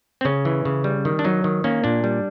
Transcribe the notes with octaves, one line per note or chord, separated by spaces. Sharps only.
C4
C#3 C#4
E3
C#3
G3
D#3
D4
F#3 D#4
D#3
A#3 C#4
A#2 D4
G3